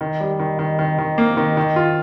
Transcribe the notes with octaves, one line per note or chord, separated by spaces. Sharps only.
D#3
G3
D#3
D#3
D#3
D#3
A#3
D#3
D#3
F4